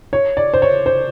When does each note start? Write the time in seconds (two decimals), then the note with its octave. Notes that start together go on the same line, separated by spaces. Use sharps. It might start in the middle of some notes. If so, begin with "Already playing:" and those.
0.13 C#5
0.37 D5
0.54 C5
0.62 C#5
0.86 C5